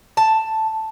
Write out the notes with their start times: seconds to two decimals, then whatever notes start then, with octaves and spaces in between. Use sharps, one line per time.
0.17 A5